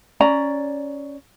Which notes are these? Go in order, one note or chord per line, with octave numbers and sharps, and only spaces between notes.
C#4 D5 A#5